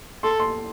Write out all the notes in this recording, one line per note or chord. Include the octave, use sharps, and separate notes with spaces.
A4 C6
C6